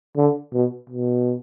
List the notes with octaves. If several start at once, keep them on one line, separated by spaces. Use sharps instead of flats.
D3
B2
B2